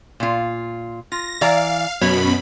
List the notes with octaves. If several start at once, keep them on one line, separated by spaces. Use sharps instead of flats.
A#2 F4
F4 A#6
E3 D5 F5 A#5
F#2 B2 C#5 B5